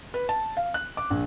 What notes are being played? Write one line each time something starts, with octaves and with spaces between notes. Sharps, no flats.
B4
A5
F5
F#6
D6
A#1